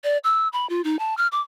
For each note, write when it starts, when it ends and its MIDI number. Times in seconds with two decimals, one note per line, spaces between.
0.04 0.18 74
0.24 0.48 88
0.53 0.67 83
0.70 0.82 65
0.84 0.99 63
0.99 1.14 81
1.18 1.27 89
1.32 1.41 86